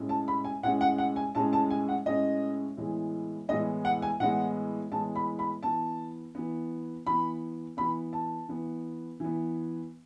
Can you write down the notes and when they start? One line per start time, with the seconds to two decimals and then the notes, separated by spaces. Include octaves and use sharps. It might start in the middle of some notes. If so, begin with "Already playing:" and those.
Already playing: A2 G#3 C#4
0.09 A5
0.28 B5
0.44 G#5
0.63 A2 G#3 C#4 F#5
0.81 F#5
0.98 F#5
1.16 G#5
1.35 A2 G#3 C#4 A5
1.53 A5
1.70 G#5
1.89 F#5
2.06 A2 G#3 C#4 D#5
2.77 A2 E3 G#3 B3
3.49 A2 E3 G#3 B3 D#5
3.85 F#5
4.02 G#5
4.20 A2 E3 G#3 B3 F#5
4.92 A2 E3 G#3 B3 A5
5.16 B5
5.39 B5
5.63 E3 B3 A5
6.35 E3 B3
7.06 E3 B3 B5
7.77 E3 B3 B5
8.13 A5
8.48 E3 B3
9.20 E3 B3